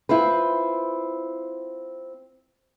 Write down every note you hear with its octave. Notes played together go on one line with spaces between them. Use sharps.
C4 E4 F4 B4